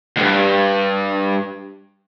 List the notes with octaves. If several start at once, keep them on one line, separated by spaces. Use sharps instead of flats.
D2 G2